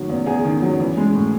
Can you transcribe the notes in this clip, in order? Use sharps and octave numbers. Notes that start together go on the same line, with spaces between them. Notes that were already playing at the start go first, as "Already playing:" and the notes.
Already playing: A2 D#3 F#3
E2
E2 G#4
D#3
F#3
E3
G#3
A2